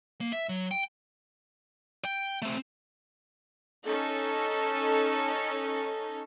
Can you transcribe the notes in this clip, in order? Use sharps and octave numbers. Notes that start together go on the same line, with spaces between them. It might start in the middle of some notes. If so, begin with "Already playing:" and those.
A#3
E5
F#3
G5
G5
A3 C4
C#4 D#4 A4